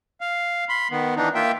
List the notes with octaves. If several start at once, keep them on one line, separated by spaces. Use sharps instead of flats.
F5
B5 C6
D#3 B3
E3 D4 D#4
A#3 F4 E5 G5